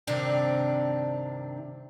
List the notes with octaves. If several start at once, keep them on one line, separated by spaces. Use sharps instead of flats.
G2 C3 D#3 C4 D4